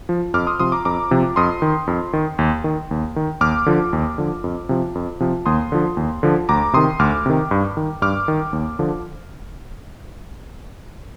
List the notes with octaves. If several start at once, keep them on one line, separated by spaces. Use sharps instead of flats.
F3
F2 D6 F6
C6 D#6
C3 F3 C6 D#6
A#5 D6
F2 A#5 D6
C3 F3
F2 C6 D#6
D#3
F2
D#3
D#2
D#3
D#2
D#3
D#2 D6 F6
D3 F3
D#2
D3 F3
F2
C3 F3
F2
C3 F3
D#2 C6 D#6
D3 F3
D#2
D3 F3
D2 A#5 D6
C3 D#3 C6 D#6
D2 D6 F6
C3 D#3
G2
D#3
G2 D6 F6
D#3
D#2
D3 F3